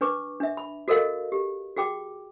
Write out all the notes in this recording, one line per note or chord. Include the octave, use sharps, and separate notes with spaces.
D4 B4 C#6 D6
D4 E5
B5
F#4 A4 A#4 D#5 F5
G4
F#4 G#4 G5 D6